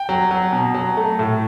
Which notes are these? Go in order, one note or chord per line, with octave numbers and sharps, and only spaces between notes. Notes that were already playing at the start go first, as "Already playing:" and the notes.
Already playing: G5
F#3
F#3
B2
F#3
A3
A2